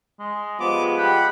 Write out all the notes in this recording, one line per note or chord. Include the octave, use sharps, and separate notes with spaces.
G#3
F3 G3 G#3 B3 D6
G4 F#5 B5